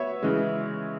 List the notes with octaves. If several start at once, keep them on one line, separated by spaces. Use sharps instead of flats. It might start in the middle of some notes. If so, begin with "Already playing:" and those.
Already playing: B3 C#5 E5
C#3 E3 G#3